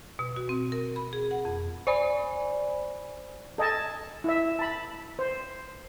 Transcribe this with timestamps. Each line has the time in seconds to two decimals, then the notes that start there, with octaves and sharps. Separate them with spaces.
0.19 B2
0.36 F#4
0.49 C4
0.72 A#4
0.96 B5
1.13 G#4
1.31 F#5
1.45 F2
1.87 C5 D5 G#5 B5
3.58 A4 D#5 G#5 A5
4.24 E4 E5
4.59 A5 B5
5.19 C5